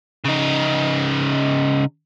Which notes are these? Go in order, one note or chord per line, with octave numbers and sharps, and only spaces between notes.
C#3 D#4